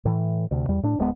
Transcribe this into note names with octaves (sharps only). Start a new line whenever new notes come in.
A2 E3
D2 C3
E2 G3
A2 D4
D1 G#3 B3